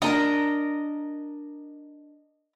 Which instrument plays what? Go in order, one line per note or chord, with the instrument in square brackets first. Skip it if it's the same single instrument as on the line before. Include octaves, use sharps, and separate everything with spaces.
[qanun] D4 A#4 A5 [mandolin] D#5 A#5